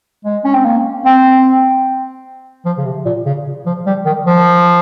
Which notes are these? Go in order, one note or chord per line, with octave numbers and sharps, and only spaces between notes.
G#3
C#4
C4
A#3
C4
F3
C#3
C3
A#2
C#3
F3
G3
D#3
F3